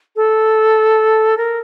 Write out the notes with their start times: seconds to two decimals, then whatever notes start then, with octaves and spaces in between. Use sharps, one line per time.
0.16 A4
1.37 A#4